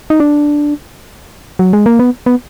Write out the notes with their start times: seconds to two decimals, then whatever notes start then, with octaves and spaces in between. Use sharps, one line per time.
0.10 D#4
0.20 D4
1.59 F#3
1.73 G#3
1.86 A#3
1.99 B3
2.26 B3